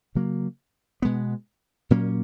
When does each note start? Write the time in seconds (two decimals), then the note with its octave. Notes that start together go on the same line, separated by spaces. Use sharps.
0.15 C#3 F#3 A#3
1.02 B2 G#3 B3
1.90 A#2 F#3 A#3 C#4